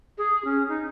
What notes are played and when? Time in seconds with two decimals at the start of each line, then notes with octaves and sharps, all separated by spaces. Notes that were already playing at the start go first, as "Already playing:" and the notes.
0.18 G#4
0.44 C#4
0.68 D#4